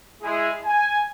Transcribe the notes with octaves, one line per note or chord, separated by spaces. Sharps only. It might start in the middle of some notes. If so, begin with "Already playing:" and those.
G#3 E4 G#4
G#5